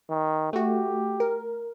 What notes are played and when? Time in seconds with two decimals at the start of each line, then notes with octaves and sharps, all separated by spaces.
0.10 D#3
0.53 A3 F#4 G4
1.20 A#4